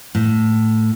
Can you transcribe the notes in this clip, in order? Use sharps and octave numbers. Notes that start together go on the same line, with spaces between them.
A2